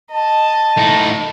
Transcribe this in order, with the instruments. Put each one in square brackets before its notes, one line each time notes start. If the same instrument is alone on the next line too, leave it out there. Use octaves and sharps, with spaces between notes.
[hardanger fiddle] D#5 [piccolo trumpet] A5
[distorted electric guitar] A2 D#4